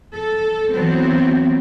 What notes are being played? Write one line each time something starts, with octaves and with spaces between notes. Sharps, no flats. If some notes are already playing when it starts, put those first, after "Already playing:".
A4
E3 F#3 B3 C4